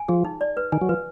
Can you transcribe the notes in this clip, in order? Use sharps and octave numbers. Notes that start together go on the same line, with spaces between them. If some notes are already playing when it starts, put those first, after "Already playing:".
Already playing: G#5
F3 G#4
D#4
D5
B4
D#3 G#5
F#3
F3 B4